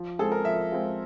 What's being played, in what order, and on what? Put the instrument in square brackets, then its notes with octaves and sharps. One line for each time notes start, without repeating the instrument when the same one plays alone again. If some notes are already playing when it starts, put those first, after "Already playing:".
Already playing: [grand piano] F3
[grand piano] G#3 C4 F4 G#4 [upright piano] A4
[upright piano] A#4
[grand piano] F3 [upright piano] E5
[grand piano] G#3 C4 F4 G#4